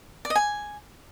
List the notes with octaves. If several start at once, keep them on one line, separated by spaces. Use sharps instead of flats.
D5
D#5
G#5